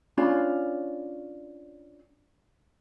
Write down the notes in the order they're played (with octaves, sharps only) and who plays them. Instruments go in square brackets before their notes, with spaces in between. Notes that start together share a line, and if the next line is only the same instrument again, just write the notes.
[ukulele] C#4 D4 F4 B5